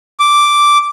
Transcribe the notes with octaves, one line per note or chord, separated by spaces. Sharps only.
D6